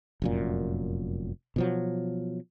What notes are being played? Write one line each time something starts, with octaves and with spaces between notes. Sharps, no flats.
F1 F#2 A#2
B2 F3 F#3